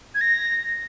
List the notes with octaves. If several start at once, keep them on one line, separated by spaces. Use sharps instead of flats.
G#6
A#6